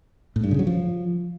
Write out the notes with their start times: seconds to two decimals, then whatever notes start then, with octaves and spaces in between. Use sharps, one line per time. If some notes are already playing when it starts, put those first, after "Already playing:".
0.36 A2
0.44 G2
0.51 C#3
0.59 F#3
0.67 F3